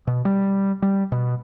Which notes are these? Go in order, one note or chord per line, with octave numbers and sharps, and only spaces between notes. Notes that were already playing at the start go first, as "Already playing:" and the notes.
B2
G3
G3
B2